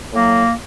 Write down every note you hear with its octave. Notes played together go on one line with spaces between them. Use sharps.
A2 F#3 A#3